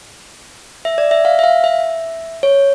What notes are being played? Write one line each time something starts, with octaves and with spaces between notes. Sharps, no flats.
E5
D5
E5
F5
E5
F5
E5
C#5